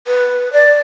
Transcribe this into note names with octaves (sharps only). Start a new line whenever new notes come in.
B4
D5